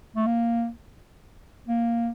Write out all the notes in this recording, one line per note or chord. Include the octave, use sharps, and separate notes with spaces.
A3
A#3
A#3